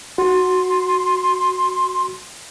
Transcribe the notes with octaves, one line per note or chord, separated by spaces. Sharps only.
F#4 C6